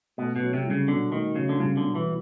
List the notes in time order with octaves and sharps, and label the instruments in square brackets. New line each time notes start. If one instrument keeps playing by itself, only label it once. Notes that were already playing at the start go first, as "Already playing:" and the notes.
[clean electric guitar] B2 [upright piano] A3
[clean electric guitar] B2
[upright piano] F#3
[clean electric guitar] C3
[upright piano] C2
[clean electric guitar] C#3
[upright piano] B2 [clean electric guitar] D3
[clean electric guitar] D#3 [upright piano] A3
[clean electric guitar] C#3 [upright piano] F#3
[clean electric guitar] D3
[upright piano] C2 [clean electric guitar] C#3
[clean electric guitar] D3
[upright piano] B2
[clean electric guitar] E3